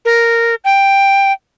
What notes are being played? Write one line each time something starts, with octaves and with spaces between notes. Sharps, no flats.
A#4
G5